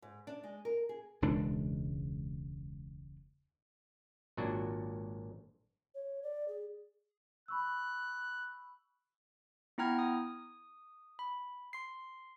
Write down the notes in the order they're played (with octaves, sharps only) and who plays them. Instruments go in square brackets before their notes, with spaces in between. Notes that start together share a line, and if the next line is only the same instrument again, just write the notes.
[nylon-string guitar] G#2
D4
G#3
A#4
G#4
[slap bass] E1 C#2 G#3 D4
[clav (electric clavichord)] G#1 A#2 F#3 D4 F#4
[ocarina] C#5
D5
G#4
[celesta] B5 C#6 E6 [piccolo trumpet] F#6
[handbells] B3 E4 G5 A#5 F6 G#6
D#6
B5
C6 C7